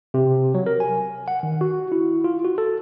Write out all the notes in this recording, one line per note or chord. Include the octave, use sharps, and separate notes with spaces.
C3
F#3
A#4
G#5
F#5
D#3
F#4
E4
F4
F#4
A4